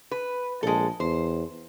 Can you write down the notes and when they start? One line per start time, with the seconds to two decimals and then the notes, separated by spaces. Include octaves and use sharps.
0.11 B4
0.63 A#1 G#3 A4
1.00 E2 C5